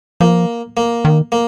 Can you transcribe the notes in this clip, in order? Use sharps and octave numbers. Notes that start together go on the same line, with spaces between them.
F3 A#3
A#3
D#3
A#3